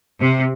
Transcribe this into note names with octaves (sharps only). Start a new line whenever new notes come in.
C3